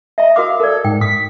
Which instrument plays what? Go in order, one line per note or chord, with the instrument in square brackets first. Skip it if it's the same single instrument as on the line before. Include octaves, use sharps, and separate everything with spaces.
[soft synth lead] D#5 [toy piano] E5 A#5
[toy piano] F#4 A#4 D6 [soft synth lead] F5
[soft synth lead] A4 [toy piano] A#4 D5
[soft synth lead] G#2 [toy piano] G5
[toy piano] D#6 [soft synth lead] B6